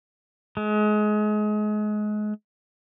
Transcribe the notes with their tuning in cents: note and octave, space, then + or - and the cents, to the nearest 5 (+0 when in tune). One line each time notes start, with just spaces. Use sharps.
G#3 +30